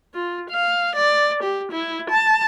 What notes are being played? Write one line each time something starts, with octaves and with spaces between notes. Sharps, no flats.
F4
F5
D5
G4
E4
A5